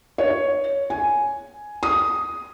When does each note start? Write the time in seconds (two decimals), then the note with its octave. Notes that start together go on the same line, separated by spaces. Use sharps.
0.18 C#5
0.90 G#5
1.83 D#6